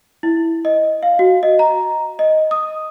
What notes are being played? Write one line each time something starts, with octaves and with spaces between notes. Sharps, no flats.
E4
D#5
F5
F#4
D#5
A#5
D#5
D#6